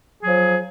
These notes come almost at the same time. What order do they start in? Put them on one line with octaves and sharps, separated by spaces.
G#4 F#3 F3